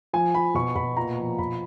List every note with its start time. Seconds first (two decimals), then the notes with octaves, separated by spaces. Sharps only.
0.13 F3 G#5
0.35 F3 B5
0.55 B2 C#6
0.76 B2 B5
0.97 A#2 A#5
1.18 F3
1.39 B2 B5